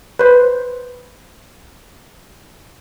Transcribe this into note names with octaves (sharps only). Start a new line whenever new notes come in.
B4 C5